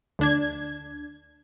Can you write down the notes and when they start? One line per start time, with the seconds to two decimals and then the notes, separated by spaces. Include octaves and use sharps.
0.19 D2 D4 G#6